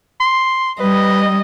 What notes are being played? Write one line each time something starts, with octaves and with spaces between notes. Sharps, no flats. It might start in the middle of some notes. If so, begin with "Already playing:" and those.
C6
G3 B4 D#5